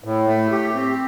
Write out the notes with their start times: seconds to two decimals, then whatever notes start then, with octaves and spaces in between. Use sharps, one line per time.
0.04 A2
0.28 A3
0.52 G4
0.75 C4